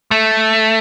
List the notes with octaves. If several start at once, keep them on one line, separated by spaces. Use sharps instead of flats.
A3